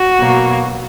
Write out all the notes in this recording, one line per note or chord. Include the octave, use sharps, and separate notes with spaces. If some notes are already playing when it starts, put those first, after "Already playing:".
Already playing: F#4
B2 F#3 A#3